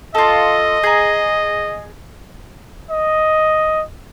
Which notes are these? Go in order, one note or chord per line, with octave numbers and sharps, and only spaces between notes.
F4 A4 D#5
G#4 A#5
D#5